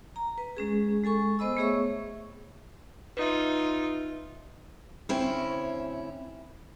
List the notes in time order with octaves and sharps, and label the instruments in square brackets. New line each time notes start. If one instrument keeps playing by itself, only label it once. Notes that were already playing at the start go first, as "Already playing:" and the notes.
[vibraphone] A#5
B4
G#3 C#4 G#4
G#3 A4 G#5 C#6
B3 C5 D#5 B5 E6
A3 B3 G#4 C#5 E5 C#6
[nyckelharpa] D#4 F4 [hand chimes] B4 E5
[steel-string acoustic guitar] D2 C4 C#4 E4